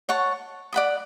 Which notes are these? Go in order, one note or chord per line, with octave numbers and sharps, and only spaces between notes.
C#5 F#5 A5 C#6
D5 F#5 B5 D#6